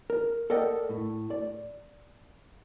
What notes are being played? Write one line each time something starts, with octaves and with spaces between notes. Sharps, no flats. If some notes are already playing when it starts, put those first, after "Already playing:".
A#4
A4 A#4 D5 D#5 F#5 G5
A2
D5